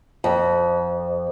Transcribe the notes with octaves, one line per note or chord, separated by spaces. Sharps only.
F2